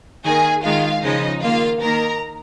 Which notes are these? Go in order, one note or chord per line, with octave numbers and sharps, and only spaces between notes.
D#3 A#3 G#4 G#5
D#3 G#3 F4 F5
C#3 F3 G#3 D#4 D#5
D#3 A#3 F4 F5
D#3 A#3 A#4 A#5